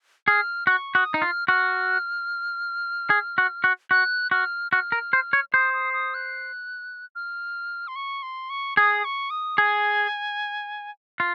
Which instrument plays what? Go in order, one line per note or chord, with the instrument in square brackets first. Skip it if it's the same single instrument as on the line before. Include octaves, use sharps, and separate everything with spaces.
[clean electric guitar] G#4 [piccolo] F6
[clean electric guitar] F#4 [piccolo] C#6
[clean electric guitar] F#4 [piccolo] D#6
[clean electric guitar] D#4
[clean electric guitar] F4 [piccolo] F6
[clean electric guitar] F#4 [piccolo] F6
[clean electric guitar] G#4
F#4
F#4
[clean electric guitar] F#4 [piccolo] F#6
[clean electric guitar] F#4 [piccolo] F6
[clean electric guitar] F#4 [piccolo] F6
[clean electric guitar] A#4
C5
C#5
[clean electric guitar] C5 [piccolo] D#6
[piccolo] D#6
D#6
F#6
F6
C6
C#6
C6
C#6
[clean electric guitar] G#4 [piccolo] D#6
[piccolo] C#6
D#6
[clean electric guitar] G#4 [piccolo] G#5
[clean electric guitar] F4